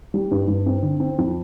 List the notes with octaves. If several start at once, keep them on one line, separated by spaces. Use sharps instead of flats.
G3
G2
G2
C4
D3
C4
F2